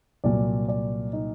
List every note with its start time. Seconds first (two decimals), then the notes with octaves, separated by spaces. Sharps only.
0.24 C2 A#2 F#3 D5
0.68 D5
1.13 D#4